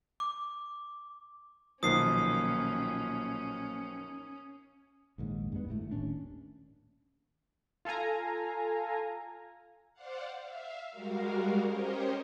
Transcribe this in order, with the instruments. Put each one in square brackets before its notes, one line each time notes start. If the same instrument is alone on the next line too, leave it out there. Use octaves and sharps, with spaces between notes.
[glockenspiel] D6
[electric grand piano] B1 D#3 F3 [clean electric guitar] A#2 [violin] C#4 [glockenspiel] D#6 C7
[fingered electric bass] A#1 D#2 G#2
G2 G#3 B3
G#1 A2 A3
D#1 D#2 C#4 D4
[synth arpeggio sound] F4 A4 F5 G#5 A#5
[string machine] C5 D5 F5 F#5
E5 F5
G3 G#3 F#4 A#4 F5
C#4 G4 A#4 C5 C#5 D#5